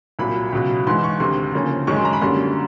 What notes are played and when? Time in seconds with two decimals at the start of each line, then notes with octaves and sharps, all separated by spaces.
0.19 C2 A#2 F#3 B5
0.53 C#2 B2 F#3
0.87 G#2 E3 G#3 C6
1.04 C#6
1.20 D2 C3 D#3 C6
1.53 D2 C#3 F3 A#3 C#4
1.87 F#2 D#3 G#3 C#4 C#6
1.96 C6
2.05 A#5
2.13 B5
2.21 F#2 D3 G3 A#3 C6